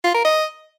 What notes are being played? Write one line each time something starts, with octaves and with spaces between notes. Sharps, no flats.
F4
A#4
D#5